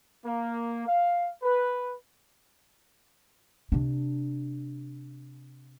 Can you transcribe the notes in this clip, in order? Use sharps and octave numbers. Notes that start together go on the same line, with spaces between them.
A#3
F5
B4
C3 D4